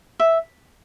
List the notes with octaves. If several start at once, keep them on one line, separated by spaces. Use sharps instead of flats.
E5